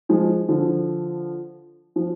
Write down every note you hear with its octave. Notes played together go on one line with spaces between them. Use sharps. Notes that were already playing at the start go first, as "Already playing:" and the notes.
F3 G#3
D3 F3
F3